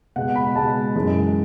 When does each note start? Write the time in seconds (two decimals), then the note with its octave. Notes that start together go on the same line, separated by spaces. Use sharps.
0.16 B2 G#3 F#5
0.36 B5
0.55 B2 G#3 A5
0.96 F#2 E3 G#3